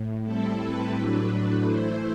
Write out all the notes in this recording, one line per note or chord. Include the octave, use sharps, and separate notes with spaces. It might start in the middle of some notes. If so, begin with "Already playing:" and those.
Already playing: A2
A2 G3 C4 E4 A4
B4
A2 F#3 A3 D4
E3 A3 E4 C5